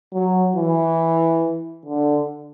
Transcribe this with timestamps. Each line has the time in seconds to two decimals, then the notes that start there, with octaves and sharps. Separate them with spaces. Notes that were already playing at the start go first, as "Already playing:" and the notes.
0.13 F#3
0.56 E3
1.85 D3